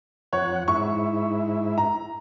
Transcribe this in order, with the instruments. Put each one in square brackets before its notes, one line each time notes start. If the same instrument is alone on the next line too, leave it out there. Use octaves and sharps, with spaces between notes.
[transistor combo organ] F2 F#5 [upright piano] C#5
[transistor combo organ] G#2 E4 [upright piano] C#6
[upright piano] A#5